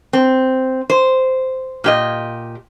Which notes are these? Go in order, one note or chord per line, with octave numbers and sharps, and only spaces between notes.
C4
C5
A#2 G4 D#5